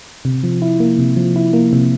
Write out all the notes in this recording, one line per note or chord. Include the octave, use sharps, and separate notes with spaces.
C3
F3
E4
A#3
C3
F3
E4
A#3
C3